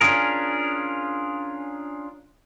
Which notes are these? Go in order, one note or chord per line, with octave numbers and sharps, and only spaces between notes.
C#4 D4 F4 G#4 A#4